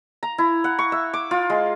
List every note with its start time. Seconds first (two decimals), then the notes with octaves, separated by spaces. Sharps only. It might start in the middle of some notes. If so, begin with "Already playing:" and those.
0.23 A#5
0.38 E4
0.64 F#5
0.79 C#6
0.92 E5
1.14 D6
1.31 F4
1.50 G#3